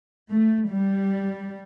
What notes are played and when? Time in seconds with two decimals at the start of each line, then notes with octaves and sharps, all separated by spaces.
0.31 A3
0.70 G3